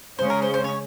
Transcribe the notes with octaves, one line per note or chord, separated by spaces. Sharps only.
C#3 G#3 C#4 C5
A#4
C5
C5
C#5